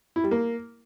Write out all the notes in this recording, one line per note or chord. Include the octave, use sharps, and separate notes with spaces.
E4
G3
A#3